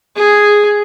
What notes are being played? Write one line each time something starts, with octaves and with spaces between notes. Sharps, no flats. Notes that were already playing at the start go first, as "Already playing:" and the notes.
G#4